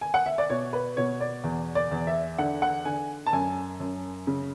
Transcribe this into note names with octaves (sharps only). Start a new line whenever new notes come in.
G#5
F#5
E5
D5
B2 C#5
B4
B2 C#5
D5
E2
D5
E2
E5
D3 F#5
F#5
D3 G#5
A5
F#2 G#5
F#2
C#3